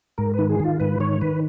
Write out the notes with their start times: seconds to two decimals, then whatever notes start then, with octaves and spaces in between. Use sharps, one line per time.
0.18 G#2 A#4
0.34 B4
0.39 D#3
0.49 G#4
0.60 D#3 F4
0.80 G#2 B4
1.00 D#3 C#5
1.21 D#3 B4